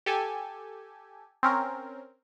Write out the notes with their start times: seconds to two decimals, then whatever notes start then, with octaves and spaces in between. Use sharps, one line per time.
0.06 G4 A4 G#5
1.43 C4 C#4 A#4